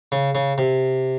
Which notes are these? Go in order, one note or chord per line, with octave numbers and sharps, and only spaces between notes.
C#3
C#3
C3